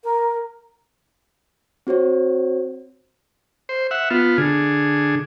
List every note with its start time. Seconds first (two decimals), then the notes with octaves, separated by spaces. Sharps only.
0.04 A#4
1.87 C4 F#4 C5 C#5
3.69 C5
3.91 E5 F#5
4.11 B3 F4
4.38 D3 G#4